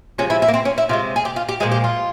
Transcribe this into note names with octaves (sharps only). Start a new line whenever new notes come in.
C3 F3 G#3 C#4
E4
E4
A#3
C4
C#4
E4
C3 F3 G#3 F4
G#4
G4
F4
G4
A#2 F3 G#3 G#4
G4
F4